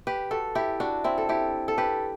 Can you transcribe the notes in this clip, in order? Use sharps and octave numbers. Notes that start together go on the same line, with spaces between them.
G4 B4
F#4 A4
E4 G4
D4 F#4
C4 E4
A4
E4 G4
A4
G4 B4